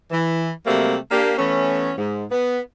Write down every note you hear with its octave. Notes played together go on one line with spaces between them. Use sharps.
E3
C3 F#3 G3 A3 A#3 C4
A#3 D4 G4
E3 A3 B3 C#4
G#2
B3